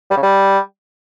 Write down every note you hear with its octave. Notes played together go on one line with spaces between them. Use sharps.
G3
C#3
G3